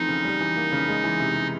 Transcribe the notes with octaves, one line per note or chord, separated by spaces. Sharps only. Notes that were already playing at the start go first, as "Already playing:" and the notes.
Already playing: E3 F3 A3 C4 D#4
C#3
G3
E3
A#3
C#3
G#3
E3
C3
C3